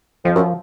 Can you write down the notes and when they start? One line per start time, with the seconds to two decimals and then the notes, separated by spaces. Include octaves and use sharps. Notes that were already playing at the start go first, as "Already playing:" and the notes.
0.24 F2 F3
0.35 F#2